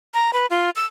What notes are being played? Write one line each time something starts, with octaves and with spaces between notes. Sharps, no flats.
A#5
B4
F4
E6